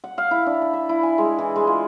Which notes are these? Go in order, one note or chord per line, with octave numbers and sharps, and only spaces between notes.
F#5
F5
E4
D4
B5
E5
E4
G#5
G#3
E3
G#3
F4